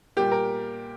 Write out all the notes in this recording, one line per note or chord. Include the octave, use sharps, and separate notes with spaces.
A#2 G3 A#3 G4
A#4